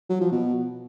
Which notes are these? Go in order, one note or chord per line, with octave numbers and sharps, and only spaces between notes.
F#3
F3
B2